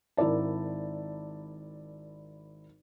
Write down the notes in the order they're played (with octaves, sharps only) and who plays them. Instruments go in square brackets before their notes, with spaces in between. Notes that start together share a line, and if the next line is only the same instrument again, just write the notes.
[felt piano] G#1 E4 A#4 D5 A5